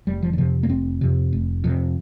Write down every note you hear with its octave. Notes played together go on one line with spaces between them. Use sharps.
F1 G3
F3
D3
F2 C3 F3
A#3
F1 C4
F2 C3
F1
F2 C3